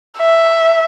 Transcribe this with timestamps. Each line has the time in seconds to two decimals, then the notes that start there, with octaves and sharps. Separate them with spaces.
0.18 E5